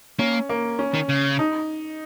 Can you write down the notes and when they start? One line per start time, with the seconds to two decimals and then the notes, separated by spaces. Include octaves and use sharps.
0.19 A#3 C#4
0.49 A#3
0.79 C#4
0.94 D#3
1.09 C#3
1.39 D#4